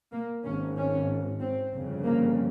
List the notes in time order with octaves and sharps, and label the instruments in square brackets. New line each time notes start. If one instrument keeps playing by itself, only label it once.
[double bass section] A#3
G#1 G#2 C#4
C#4
C4
G1 F2 C#3
A#3